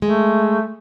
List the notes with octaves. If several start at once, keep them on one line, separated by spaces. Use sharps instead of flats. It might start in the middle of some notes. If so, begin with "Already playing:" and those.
G#3 A3